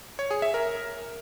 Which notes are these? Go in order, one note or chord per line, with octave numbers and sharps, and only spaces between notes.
C#5
G#4
E5
A#4